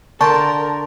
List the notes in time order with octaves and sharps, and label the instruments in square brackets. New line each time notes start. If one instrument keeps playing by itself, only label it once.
[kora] D3 G5 [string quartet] A#4 [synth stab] A5 [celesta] C6 C#6